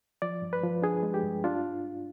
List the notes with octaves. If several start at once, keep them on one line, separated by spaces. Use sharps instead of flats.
F3 D5
G2
B4
F3
D4 G#4
G#3
G4
G2
D4 F4